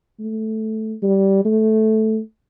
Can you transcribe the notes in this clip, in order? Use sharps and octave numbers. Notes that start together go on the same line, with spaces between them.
A3
G3
A3